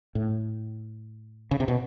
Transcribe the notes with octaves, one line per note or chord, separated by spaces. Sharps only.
A2
C#3
C3
B2